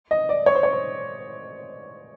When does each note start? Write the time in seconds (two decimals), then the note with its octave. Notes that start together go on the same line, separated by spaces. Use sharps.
0.11 D#5
0.29 D5
0.46 C#5
0.55 C5
0.63 C#5
0.73 C5